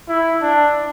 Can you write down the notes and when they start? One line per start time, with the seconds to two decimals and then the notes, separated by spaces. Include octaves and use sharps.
0.09 E4
0.42 D4